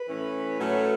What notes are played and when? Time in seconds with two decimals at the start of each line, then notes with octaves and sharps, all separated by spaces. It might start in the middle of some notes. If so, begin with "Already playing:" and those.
Already playing: B4
0.08 A2 E3 C#4
0.59 A2 F#3 A3 C#4